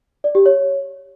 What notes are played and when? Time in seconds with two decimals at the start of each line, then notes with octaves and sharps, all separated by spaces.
0.24 D5
0.35 G4
0.46 C#5